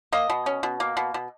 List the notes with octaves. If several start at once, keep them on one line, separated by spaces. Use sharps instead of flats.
A#3 D#5
B2
C#4
B2
A#3
B2
B2